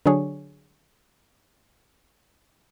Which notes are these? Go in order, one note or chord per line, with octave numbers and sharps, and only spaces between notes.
D3 F#3 D4 G#4 C#5